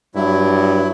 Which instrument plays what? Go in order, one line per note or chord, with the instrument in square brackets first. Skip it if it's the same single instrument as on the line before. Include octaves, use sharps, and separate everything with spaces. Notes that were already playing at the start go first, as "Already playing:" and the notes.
[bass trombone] G2 [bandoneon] F#3 E4